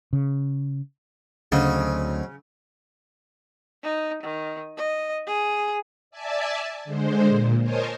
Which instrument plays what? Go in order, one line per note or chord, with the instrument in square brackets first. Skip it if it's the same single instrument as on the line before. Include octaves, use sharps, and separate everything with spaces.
[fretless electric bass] C#3
[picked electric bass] D2 [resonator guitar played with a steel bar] C#3 [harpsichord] F#3 C4 D#4
[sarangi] D#4
D#3
D#5
G#4
[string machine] D5 E5 G#5 A5
D3 G#3 C5
A#2
A#4 C5 C#5 D#5 G#5 A5